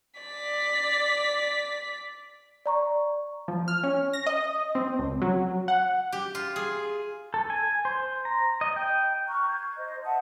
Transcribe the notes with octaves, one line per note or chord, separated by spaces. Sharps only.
D5 B6
D5 A#5 C#6
F3
F6
C#4
A#6
D#5
C4
C#2
F#3
F#5
G4
F4
G#4
A4
G#5
C5
A#5
D#5
G5
A#5 C#6 F6 F#6
G6 G#6
C5 D#5
E5 F#5 A5 D#6